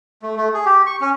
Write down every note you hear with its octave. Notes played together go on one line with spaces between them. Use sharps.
A3
A3
G#4
G4
C#6
C#4